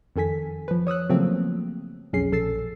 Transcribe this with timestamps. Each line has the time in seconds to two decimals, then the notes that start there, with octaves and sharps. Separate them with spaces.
0.16 F2 D#3 A4 G#5 B6
0.68 F3 B4
0.87 C#5 D#6 E6 F#6
1.10 C#3 F3 F#3 A3 A#3 C4
2.13 B1 F2 C#4 G#4 C7
2.32 A#1 A4 E6 A6 C7